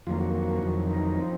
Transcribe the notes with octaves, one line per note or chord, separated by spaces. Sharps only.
F2 D#3 F#3 A#3 F4
F#4
F#4
F2 D#3 F#3
D#4
F3 C4